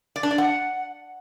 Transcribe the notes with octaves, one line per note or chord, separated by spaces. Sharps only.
D5
D4
D5
F#5